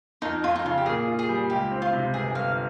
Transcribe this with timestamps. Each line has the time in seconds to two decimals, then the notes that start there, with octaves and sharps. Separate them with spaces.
0.22 F2 D#4
0.44 F2 F4
0.56 D#4
0.65 C#3 F4
0.78 G4
0.86 A#2 G#4
1.08 F4
1.19 G#4
1.29 G3
1.50 C#2 G4
1.72 C4
1.82 F4
1.93 C3
2.14 G1 G#4
2.35 G1 F5